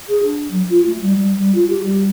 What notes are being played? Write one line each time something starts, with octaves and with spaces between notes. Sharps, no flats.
G#4
D4
F#3
F4
A3
G3
G3
G3
F4
G4
G3